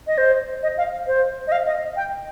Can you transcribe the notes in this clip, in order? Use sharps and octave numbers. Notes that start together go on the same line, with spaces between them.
D#5
C5
D#5
F5
C5
D#5
F5
D#5
G5